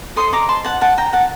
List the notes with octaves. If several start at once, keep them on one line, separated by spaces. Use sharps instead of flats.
A4 C5 D#5 C6 D#6
A#5 D6
A5 C6
F#5 A5
F#5 A5
G5 A#5
F#5 A5